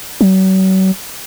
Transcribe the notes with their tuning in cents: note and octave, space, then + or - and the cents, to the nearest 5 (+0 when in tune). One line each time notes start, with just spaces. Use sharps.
F#3 +40